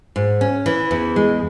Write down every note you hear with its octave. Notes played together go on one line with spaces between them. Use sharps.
G#2
C#4
E3
E2
G#3